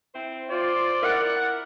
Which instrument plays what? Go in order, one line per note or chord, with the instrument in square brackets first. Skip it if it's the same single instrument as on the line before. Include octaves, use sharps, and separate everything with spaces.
[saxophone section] C4 E4 C5
[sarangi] F4 [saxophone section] C5 [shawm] D5
[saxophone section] E4 A#4 [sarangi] F#5